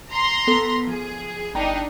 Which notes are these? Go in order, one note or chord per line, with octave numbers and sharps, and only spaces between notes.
A#5 C6
B3 A4 B6
F3 G#4
G1 D4 D#4 G5 A#5